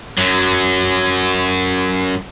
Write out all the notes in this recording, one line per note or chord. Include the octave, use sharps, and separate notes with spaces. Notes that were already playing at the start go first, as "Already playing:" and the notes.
F#2 F#3